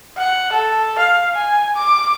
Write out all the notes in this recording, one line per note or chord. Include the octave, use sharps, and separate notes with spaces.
F#5
A4
F5
G#5
D6